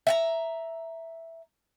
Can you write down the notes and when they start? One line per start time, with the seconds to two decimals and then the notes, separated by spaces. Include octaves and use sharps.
0.07 E5 F#5 A#5